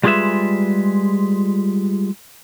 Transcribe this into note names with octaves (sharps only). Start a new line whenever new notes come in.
G3 G#3 F4 G#4 B4 E5